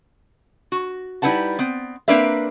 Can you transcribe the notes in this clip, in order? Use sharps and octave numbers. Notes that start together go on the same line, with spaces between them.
F#4
G3 D#4 E4 B4 F#5 A5
B3 C4
A#3 C4 D4 A#4 B4 E5